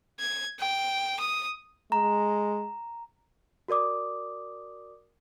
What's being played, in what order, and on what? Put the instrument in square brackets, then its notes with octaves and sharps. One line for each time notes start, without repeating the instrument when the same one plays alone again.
[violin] G#6
G5
D#6
[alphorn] G#3 [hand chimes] A#5
[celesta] F#4 A#4 D5 D6 D#6